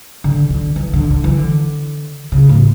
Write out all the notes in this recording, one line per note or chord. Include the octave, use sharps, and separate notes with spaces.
D3
D3
E3
D3
D3
E3
D3
C#3
A2